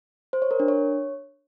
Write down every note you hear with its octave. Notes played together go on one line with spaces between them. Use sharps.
C5
C#5
A#4
D4
C#5